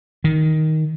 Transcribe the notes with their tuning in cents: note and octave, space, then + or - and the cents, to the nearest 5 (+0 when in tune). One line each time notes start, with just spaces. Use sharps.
D#3 +10